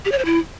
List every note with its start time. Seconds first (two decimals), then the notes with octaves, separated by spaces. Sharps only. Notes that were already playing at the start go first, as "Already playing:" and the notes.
0.05 G4
0.12 C#5
0.18 C5
0.25 E4